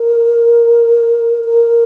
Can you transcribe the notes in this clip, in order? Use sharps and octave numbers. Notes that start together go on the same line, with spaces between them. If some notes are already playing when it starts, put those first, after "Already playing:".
Already playing: A#4
A#4